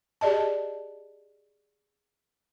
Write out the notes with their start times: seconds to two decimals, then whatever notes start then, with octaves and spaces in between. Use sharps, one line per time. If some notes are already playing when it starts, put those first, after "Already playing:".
0.21 G4 G#4 D5 D#5 A5